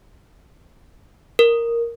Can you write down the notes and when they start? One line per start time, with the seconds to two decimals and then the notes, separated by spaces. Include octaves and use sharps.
1.39 A#4